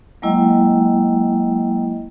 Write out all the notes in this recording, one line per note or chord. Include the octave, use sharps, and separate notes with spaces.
F#3 G#3 A#3 E4 D#5 G5